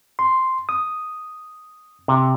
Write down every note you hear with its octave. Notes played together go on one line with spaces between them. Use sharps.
C6
D#6
C3